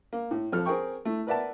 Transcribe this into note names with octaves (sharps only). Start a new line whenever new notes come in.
A#3
A2
F2 F3 A4 F6
C4 G#4 A#4 G5 C#6
A3 E4
A#4 B4 D5 E5 F#5 A5